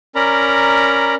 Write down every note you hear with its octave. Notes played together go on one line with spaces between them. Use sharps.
C#4 A#4 D5 A#5 B5